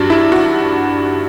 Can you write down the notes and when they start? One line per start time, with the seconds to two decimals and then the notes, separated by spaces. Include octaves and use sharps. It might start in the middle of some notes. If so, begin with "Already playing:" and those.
Already playing: G2 F#3 D4
0.10 E4
0.32 F#4